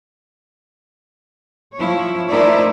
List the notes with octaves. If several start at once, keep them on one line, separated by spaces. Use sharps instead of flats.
F3 E4 C#5
A3 D#4 E4 A#4 C5 D5